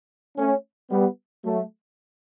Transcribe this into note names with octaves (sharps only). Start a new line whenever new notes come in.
A3 C#4
G3 B3
F#3 A3